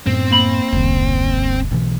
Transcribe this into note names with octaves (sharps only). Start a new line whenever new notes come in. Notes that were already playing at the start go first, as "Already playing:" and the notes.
F#2 A2 B3 C4
A#3 B5
E1 C2 G2 D3
B1 B2 D3 E3